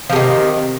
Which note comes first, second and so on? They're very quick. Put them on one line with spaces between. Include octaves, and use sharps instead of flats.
F3 C3 D#3